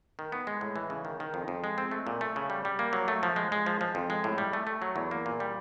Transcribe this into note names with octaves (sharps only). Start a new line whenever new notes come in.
D#3
B3
G#3
A2
E3
C#3
D#3
D#3
F2
F2
G#3
C4
A3
A#2
A3
C#3
G3
G3
A#3
F#3
A3
F3
G#3
G#3
F3
F3
F2
G#3
A2
G3
A3
A3
F#3
E2
A#3
A#2
G3